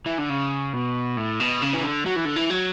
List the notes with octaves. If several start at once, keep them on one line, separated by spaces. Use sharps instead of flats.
E3
D3
C#3
B2
A2
B2
C#3
E3
D3
F#3
E3
D3
E3
F#3